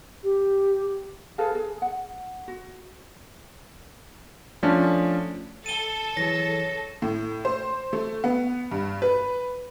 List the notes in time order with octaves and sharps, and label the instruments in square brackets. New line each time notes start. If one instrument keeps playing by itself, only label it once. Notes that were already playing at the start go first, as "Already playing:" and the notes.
[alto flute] G4
[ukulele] G#4 A4 B4 F5
G#4
F#5
F#4
[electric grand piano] F3 A3 C#4 D4
[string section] A4 [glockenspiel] D#7 G7
[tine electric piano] E3 F#3 G#4 [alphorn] C#5 [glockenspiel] A#6
[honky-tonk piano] A2
C5
A3
B3
G2
B4